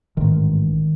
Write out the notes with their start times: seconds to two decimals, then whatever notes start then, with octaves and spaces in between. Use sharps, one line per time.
0.17 A1 G#2 D#3